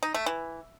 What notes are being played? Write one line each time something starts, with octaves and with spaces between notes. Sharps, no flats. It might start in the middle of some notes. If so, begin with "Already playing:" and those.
D#4
A3
E3